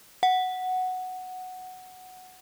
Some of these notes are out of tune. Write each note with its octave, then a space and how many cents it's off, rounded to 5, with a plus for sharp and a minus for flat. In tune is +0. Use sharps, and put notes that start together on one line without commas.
F#5 +0